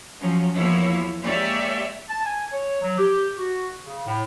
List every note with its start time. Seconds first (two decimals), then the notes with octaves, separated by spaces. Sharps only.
0.20 F3 F#3 C#4
0.55 E2 F3 A#3 E4 C#5
1.22 G#3 A#3 G4 C#5 D5 E5
2.09 A5
2.26 G#5
2.53 C#5
2.81 F#3
2.98 G4
3.39 F#4
3.86 C#3
4.06 A2